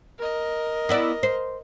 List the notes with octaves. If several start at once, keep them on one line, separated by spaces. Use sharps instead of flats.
A#4 D#5
B3 E4 D5
C5